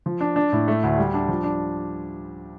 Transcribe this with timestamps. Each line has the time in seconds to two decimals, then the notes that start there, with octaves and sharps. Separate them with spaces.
0.06 F3
0.21 D4
0.36 D4
0.53 A2
0.68 A3
0.83 D2
0.98 G3
1.14 D4
1.28 F3
1.44 D4